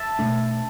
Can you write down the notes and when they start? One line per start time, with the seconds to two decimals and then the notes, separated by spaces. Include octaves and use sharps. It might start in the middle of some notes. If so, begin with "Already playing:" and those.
Already playing: E5 A5
0.19 B2 A3 D4